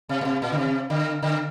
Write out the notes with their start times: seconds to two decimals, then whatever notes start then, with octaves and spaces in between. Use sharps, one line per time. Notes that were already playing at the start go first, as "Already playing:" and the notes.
0.09 C3
0.21 A#2
0.25 C3
0.42 A#2
0.52 D3
0.58 C3
0.90 D3
1.23 D3